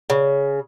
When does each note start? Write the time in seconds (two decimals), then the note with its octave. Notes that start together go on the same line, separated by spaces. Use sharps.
0.10 C#3